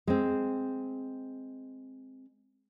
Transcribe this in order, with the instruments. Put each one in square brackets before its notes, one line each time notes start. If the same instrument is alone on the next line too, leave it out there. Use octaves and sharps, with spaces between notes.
[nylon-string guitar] G#3 C4